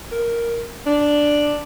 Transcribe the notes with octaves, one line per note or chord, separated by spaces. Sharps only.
A#4
D4